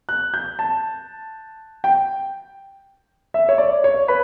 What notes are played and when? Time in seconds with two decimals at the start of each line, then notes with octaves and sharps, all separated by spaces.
0.09 F#6
0.34 G6
0.59 A5
1.84 G5
3.34 E5
3.49 C#5
3.58 D5
3.84 C#5
4.08 B4